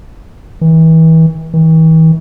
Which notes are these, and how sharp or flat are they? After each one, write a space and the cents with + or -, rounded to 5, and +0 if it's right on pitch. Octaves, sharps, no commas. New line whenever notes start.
E3 -35
E3 -45